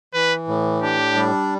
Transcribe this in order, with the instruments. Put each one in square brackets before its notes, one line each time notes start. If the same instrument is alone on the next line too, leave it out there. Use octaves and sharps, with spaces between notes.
[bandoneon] E3 [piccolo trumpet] B4
[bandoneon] A2
[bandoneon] D4 [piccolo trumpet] G4
[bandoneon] G3